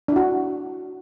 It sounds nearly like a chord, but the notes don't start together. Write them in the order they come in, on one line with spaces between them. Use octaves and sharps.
D4 E4 F#4